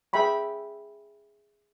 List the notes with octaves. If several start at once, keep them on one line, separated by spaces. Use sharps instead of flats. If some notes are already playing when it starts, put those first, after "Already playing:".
G#4 E5 G5 B5 C#6